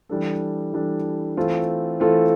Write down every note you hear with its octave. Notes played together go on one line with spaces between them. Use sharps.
E3 G3 D4 A4
E3 G3 D4 A4
E3 A3 C4 F4 A4
E3 A3 C4 F4 A4